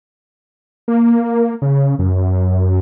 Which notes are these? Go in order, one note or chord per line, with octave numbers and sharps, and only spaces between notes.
A#3
C#3
F#2